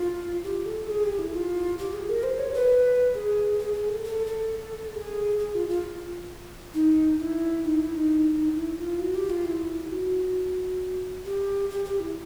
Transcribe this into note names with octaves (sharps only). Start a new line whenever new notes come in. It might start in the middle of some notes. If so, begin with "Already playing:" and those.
Already playing: F4
G4
A4
G#4
G4
E4
F4
G4
G#4
A#4
C5
C#5
B4
G#4
G#4
G#4
A4
A4
A4
G#4
G#4
F4
F4
D#4
E4
D#4
E4
D#4
E4
F4
F#4
G4
F4
E4
F#4
G4
G4
G4
E4